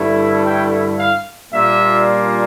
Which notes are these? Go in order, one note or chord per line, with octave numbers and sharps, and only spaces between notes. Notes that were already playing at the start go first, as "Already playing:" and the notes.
Already playing: G2 D3 A3 E4
G5
F5
A#2 G3 A#3 D4 F4 E5